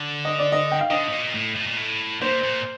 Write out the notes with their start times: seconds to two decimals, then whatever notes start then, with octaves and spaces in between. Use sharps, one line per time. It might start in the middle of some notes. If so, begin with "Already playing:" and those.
Already playing: D3
0.25 D#5
0.39 D5
0.52 D#5
0.72 G5
0.81 F5
0.90 D3 D#5
1.08 A2
1.12 A#2
1.34 A2
1.56 A2
1.66 A#2
1.77 A2
2.22 A#2 C5
2.43 A#2